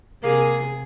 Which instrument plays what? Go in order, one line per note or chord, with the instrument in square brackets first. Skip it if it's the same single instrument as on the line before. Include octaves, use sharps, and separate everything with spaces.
[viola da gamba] C3 G#4 [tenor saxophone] A#3